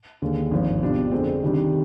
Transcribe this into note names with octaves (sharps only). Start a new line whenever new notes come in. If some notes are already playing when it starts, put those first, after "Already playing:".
D#2 D3 G#3
G#1 G2 F3
B2 G3 D4 F4
F2 D3 G#3 C4
C3 D#3 G3 D4